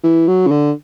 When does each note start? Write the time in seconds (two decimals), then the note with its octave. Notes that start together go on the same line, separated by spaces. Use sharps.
0.03 E3
0.28 F#3
0.47 C#3
0.51 D3